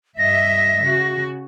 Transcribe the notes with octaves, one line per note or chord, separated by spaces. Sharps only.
G2 D#5 E5 A#6
C#3 F#4